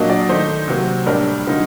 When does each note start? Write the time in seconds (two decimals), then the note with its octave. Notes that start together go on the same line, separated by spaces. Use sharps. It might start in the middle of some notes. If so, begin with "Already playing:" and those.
Already playing: A#2 F#3 A#3 D4 D#5
0.10 D5
0.29 D#3 A3 D#4 C5
0.68 C3 F#3 A#3
1.06 A2 G3 A#3 D4 A#4
1.46 D3 F#3 A#3 D#4